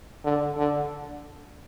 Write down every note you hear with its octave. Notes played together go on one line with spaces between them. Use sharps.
D3
D3